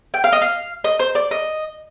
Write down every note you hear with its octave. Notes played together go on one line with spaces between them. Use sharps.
G5
F5
D#5
F5
D#5
C5
D5
D#5